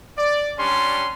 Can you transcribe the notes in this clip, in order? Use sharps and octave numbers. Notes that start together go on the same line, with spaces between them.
D5
G3 C#4 D4 C6